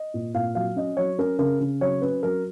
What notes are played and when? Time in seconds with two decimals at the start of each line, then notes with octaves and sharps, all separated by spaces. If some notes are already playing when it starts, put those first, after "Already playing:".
Already playing: D#5
0.14 A#2
0.34 A#2 F5
0.55 F#3 F5
0.76 C#4 D#5
0.97 F#3 C#5
1.18 C#4 A#4
1.39 C#3 A#4
1.60 C#3
1.81 F#3 C#5
2.01 C#4 B4
2.23 F#3 A#4